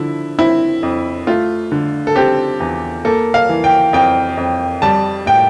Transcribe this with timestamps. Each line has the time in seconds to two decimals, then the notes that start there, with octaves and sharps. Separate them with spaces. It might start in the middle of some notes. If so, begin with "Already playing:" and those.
Already playing: D3 F3 E4
0.38 C4 E4
0.83 F2
1.27 A3 F4
1.72 D3
2.07 A4
2.16 C4 G4
2.60 E2
3.05 A#3 A4
3.34 F5
3.49 E3
3.64 G5
3.93 F2 G5
4.37 F2
4.82 G3 A5
5.26 A2 G5